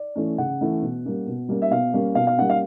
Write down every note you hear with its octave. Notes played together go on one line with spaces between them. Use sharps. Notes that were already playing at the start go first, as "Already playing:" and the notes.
Already playing: D5
E3 A3 C#4
C#3 F#5
E3 A3 C#4
B2
G3 A#3 C#4
B2
G3 A#3 C#4
E5
B2 F5
G3 A#3 C#4
B2 F5
F5
G3 A#3 C#4 F#5
F5